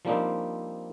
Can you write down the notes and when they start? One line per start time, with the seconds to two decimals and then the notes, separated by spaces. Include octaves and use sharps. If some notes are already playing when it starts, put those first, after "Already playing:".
0.05 F3 G3 A#3 C4 D4 D#4